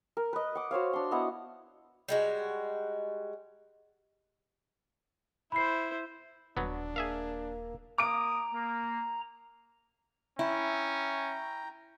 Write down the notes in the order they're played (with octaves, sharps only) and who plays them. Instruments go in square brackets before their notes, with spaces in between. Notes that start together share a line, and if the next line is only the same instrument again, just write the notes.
[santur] A#4
B4 D#5
F#5 D6
F#4 C5 C#5 F5
D4 C6
B3 E4 D#5 F#5
[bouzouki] G3 G#3 F#4
[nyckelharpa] E4 C5 [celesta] B5 C7
[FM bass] D#1 [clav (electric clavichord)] F#3 B3 [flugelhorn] D4
[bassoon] A#3 [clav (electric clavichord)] G#4 E5 F5
[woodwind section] A#3 A#4 D#6 [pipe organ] A#5 [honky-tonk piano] D6 D7
[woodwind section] A#3
[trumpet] C#4 [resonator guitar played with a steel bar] E4 [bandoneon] G5 A#5